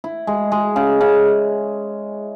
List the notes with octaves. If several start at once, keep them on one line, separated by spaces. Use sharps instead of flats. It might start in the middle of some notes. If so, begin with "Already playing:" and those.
E4
G#3
G#3
C#3
C#3